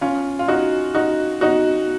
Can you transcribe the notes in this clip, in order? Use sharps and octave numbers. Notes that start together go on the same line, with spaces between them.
C#4 F4
F4
D#4 F#4
D#4 F#4
D#4 F#4